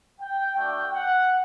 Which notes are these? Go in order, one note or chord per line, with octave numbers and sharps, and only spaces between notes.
G5
A3 D4 F#4 G5
F#5